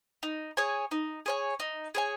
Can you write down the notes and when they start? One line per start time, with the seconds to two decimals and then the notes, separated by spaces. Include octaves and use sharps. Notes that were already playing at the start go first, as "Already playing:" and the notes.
0.23 D#4
0.57 G#4 C#5 G#5
0.91 D#4
1.26 G#4 C#5 G#5
1.60 D#4
1.95 G#4 C#5 G#5